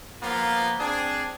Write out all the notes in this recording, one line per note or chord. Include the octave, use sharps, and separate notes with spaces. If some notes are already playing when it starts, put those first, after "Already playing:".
F3 A#3 B3 F4
C4 D4 G#4